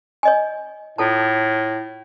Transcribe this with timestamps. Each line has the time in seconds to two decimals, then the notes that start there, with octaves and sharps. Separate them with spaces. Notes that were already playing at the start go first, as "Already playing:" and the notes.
0.23 C#5 D#5 G#5
0.98 A2 F4 A4 A5